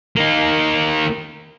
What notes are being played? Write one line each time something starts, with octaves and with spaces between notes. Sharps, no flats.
A#3 D#4